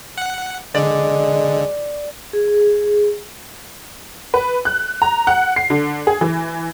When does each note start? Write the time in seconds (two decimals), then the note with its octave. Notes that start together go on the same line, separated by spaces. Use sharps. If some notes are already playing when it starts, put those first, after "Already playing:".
0.18 F#5
0.74 D3 G#3 D5
2.33 G#4
4.34 B4
4.65 F#6
5.02 A#5
5.27 F#5
5.56 C7
5.70 D3
6.07 G#4
6.21 E3